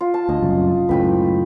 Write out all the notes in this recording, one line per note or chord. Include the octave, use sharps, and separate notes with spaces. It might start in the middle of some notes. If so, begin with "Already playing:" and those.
F4
A5
D2 D#5
F#1 C2 F#2
C#2 F#2 A2 B4 G5 B5